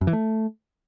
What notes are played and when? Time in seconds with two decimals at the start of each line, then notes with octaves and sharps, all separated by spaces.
0.01 F#2
0.07 E3
0.13 A3